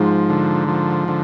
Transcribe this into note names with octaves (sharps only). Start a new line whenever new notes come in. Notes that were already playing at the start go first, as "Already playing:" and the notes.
Already playing: G#2 F3
D3
F3
D3